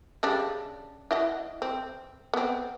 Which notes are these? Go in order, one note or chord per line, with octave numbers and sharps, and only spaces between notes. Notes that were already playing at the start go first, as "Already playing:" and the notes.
C#3 G3 D4
E4 D#5 F#5
C4
B3 C4